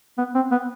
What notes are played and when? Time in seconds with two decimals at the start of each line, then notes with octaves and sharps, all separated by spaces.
0.18 B3
0.35 C4
0.51 B3